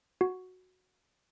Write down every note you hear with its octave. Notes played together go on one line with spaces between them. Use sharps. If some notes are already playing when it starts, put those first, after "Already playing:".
F#4